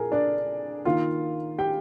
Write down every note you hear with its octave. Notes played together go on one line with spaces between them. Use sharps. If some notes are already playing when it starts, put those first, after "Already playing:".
Already playing: A#2 G#4 A#4
D4 D5
D#3 A#3 F4 F5
G4 G5